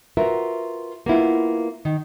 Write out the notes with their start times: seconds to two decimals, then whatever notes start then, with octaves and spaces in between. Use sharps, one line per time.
0.17 F4 F#4 A#4 B4 E5
1.06 A#3 B3 E4 F4
1.85 D#3